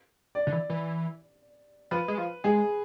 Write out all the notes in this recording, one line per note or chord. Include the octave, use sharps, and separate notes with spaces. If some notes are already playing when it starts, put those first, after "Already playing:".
D5
D3
E3
E3
F3 B4
G#3
F3
G#3 G#4